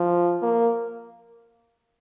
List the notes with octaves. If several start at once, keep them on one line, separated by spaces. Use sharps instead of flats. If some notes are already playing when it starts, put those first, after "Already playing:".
Already playing: F3
A#3